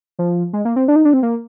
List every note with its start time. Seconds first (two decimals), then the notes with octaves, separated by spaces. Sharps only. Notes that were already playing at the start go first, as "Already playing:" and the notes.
0.19 F3
0.53 G#3
0.65 A#3
0.76 C4
0.88 D4
0.96 D#4
1.05 D4
1.13 C4
1.23 A#3